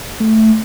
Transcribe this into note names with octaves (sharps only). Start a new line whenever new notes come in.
A3